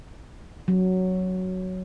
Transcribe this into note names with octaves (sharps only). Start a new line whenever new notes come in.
F#3